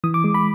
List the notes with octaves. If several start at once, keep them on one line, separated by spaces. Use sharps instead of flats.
E3 D#6
D6
G#3
B5